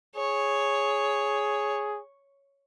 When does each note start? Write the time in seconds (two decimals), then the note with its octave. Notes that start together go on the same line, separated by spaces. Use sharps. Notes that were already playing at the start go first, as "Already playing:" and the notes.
0.16 G#4 C#5